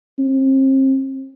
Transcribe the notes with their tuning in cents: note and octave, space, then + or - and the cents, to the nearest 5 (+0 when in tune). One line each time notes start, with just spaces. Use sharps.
C4 +35